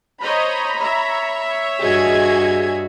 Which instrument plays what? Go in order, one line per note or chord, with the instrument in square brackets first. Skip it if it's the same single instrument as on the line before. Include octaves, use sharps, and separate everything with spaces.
[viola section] C5 C#5 D#5 [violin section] A#5 B5
[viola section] C#5 E5
[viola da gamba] G2 F#4 [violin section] G#4 D#5 G#6